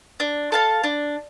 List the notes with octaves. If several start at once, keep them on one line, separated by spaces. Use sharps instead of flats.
D4
A4 F5 A5
D4